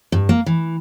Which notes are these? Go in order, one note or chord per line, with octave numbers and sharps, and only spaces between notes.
G2
A#3
E3